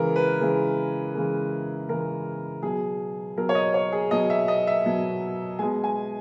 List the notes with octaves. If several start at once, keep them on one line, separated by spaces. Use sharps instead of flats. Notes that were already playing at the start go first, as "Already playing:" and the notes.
Already playing: C#3 E3 G#3 A#4
B4
C#3 E3 G#3
C#3 E3 G#3
C#3 E3 G#3 A#4
B2 F#3 G#4
B2 F#3 A#4
C#5
D#5
C#5
G#4
B2 F#3 D#5
E5
D#5
E5
B2 F#3
B2 G#3 G#5
G#5